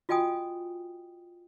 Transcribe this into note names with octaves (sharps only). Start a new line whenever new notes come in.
F4 F#4 D#5 G5 G#5 D#6